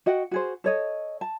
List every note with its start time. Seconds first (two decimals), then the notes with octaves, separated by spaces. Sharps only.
0.06 F#4 D#5 F#5 G5
0.31 F#4 G#4 C5
0.64 A4 C#5 D#5
1.21 A5